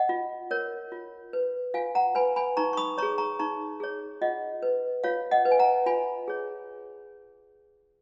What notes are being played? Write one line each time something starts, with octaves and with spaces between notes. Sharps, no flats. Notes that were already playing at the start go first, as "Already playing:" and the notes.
Already playing: D#5 F#5
F4
A#4 C#5
F4
B4
F4 F5 G#5
F#5 A#5
B4 G#5 B5
G#5 B5
D#4 A#5 C#6
C#6
B5 D#6
G#4 C#5 A#5 C#6
A#5 C#6
D#4 A#5 C#6
G#4 C#5
F4 D#5 F#5
B4
F4 C#5 F5
D#5 F#5
B4
G#5
F#5 A#5
F4 G#5 B5
G#4 C#5